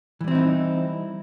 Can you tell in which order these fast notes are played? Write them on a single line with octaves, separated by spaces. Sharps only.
E3 G3 C4 E4 D#4